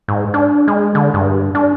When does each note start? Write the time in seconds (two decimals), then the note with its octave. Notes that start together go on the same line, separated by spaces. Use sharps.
0.08 G#2
0.34 D4
0.68 G#3
0.95 D3
1.14 G2
1.55 D4